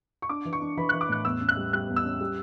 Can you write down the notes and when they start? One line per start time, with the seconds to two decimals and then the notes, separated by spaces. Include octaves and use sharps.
0.22 C#6
0.29 D4 D6
0.45 E3
0.53 C#6
0.61 D4
0.77 E3 B5
0.89 E3 F#6
1.01 D6
1.09 A2 F#6
1.25 E2 E6
1.41 C#4
1.49 F#6
1.57 G3
1.73 G3 F#6
1.88 E2
1.96 E6
2.05 C#4
2.21 G3